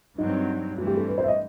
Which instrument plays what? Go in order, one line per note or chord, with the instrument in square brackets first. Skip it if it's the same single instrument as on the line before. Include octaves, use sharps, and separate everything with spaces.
[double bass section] G2 F#3 C4 [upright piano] D#4
[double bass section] G2 E3 A3 C4 [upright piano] F#4
[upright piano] G4
A4
B4
C5
E5
D#5